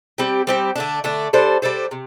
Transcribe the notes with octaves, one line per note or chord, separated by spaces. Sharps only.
G3 C4 G4
G3 C4 G4
D3 A3 D4
D3 A3 D4
G3 D4 A4 C5
G3 D4 A4 C5
C3